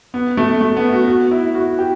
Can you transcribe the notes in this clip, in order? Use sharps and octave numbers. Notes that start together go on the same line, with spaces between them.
B3
A3
A3
B3
F#4
F#4
E4
F#4
G4